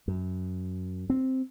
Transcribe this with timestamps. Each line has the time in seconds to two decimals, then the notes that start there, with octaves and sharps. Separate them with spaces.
0.08 F#2
1.10 C4